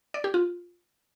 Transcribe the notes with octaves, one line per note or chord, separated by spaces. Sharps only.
D5
G4
F4